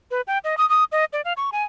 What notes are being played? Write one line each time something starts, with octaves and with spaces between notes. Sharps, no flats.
B4
G5
D#5
D#6
D#6
D#5
D5
F5
C#6
G#5